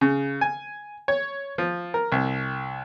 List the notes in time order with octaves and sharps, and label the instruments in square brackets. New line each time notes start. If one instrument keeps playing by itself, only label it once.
[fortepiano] C#3
G#5
C#5
F3
A#4
C2